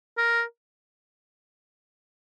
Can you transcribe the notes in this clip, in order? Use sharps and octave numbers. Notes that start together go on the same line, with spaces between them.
A#4